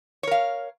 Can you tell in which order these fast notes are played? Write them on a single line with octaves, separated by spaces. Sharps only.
C#5 A#4 F5